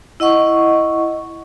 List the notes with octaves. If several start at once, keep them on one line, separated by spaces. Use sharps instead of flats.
E4 D#5 F#5 C#6